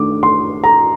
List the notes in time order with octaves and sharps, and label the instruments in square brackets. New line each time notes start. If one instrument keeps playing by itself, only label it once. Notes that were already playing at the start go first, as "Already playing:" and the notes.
Already playing: [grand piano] D#3 A3 D4 A4 [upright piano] D6
[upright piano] C6
A#5